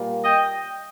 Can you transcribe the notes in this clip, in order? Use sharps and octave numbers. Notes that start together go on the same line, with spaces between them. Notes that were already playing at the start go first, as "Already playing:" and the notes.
Already playing: A#2 G3 A#3
D#5 G5